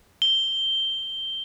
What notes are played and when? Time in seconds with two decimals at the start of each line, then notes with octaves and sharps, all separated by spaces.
0.22 G7